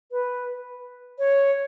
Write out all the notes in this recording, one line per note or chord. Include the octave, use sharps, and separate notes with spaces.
B4
C#5